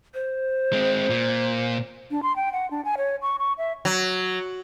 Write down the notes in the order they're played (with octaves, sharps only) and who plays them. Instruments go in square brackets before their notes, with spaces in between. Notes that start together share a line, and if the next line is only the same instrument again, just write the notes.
[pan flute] C5
[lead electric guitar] G#3 C4
A#2
[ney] D4
C6
G5
F#5
D4
G#5
C#5
C#6
C#6
E5
[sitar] F#3